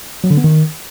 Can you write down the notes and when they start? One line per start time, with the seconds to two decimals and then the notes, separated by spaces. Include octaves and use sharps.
0.24 F#3
0.31 D3
0.37 B3
0.44 D#3